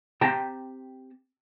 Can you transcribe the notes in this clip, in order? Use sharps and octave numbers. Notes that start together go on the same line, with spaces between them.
C4 G4 G5 A5 A#5